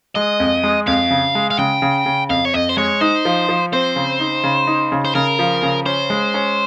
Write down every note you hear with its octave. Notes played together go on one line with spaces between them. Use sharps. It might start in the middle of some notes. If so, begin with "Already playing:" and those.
G#3 D#5
F2
G#3
F2 F5
C#3
G#3
F5
C#3 G5
C#3
C#3
F2 F5
C#5
F2 D#5
C5
G#3 C#5
D#4 C5
F3
F3
C4 C5
C#3
D#4
C#3
D#4
C#3
C5
C#3 A#4
F3
C#3
C#4 C5
G#3
C#4